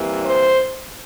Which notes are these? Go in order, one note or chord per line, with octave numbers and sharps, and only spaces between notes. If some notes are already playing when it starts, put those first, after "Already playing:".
Already playing: C3 E3 G3 A#3
C5